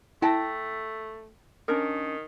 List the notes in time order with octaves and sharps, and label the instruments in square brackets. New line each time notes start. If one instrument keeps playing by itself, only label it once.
[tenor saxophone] A3 [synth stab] E4 A#6 [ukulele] G5 A5
[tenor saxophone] D#3 [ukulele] C#4 D4 A#4